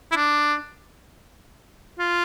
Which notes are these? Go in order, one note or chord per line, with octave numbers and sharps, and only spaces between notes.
E4
D4
F4